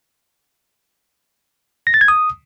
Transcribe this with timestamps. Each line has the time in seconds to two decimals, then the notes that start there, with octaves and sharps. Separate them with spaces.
1.87 A#6
1.94 A6
2.01 G#6
2.08 D#6